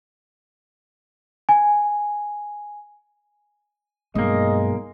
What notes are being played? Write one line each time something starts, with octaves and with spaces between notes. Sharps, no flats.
G#5
B1 G2 G#3 A#3 D#5